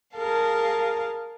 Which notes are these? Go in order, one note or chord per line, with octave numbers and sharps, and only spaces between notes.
G#4 A#4 F5 A5